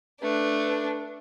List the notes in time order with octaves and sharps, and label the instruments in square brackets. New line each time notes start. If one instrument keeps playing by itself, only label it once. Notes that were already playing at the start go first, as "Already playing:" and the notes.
[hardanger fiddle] A3 [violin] D4 [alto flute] B4